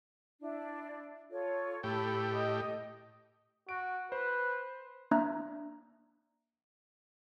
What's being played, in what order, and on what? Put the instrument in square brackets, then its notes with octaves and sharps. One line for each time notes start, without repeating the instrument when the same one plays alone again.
[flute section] D4 E4
F4 A4 C#5
[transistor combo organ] A2 G4 [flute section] A4 B5 E6
[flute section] D#5 D#6
[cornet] F#4 [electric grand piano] D7
[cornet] B4 [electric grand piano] C5
[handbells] A#3 D4 E5 A#5 F#6